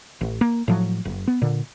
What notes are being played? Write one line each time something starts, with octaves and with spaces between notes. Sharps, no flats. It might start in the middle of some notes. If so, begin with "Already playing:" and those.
A1
A#3
A2 F3 F#3
F#1
B3
A#2 D3